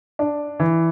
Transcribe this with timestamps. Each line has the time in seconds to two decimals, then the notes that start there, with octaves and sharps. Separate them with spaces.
0.19 D4
0.60 E3